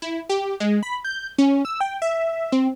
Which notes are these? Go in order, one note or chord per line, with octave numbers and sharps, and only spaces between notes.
E4
G4
G#3
B5
G6
C#4
E6
G5
E5
C4